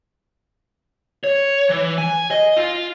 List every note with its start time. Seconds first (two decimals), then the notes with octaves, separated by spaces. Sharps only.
1.24 C#5
1.70 E3
1.98 G#5
2.31 D#5
2.57 F4